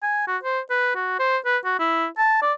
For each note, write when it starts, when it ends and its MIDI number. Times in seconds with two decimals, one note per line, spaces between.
0.03 0.25 80
0.27 0.37 66
0.43 0.60 72
0.70 0.94 71
0.95 1.15 66
1.19 1.37 72
1.45 1.57 71
1.65 1.75 66
1.80 2.06 64
2.18 2.38 81
2.42 2.53 74